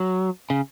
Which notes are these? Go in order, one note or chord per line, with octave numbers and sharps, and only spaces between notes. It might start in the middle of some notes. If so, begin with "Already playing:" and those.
Already playing: F#3
C#3